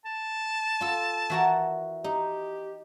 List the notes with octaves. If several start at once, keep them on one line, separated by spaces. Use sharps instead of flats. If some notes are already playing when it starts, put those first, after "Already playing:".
A5
F4 A4
E3 F#4 A#4
D#4 G4